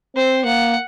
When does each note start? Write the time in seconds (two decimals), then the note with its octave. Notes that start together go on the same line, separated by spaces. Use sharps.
0.16 C4 C5
0.44 A#3 F#5